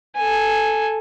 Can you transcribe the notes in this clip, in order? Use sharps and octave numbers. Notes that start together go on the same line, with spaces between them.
A4 G#5